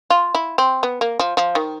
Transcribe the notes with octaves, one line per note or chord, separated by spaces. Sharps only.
F4
E4
C4
B3
A#3
F3
F3
D#3